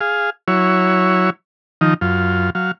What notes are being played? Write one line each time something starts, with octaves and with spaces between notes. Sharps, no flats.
G#4 F5
F#3 E4 C#5
D#3 F3 D#4
F#2 F4
F#3 F5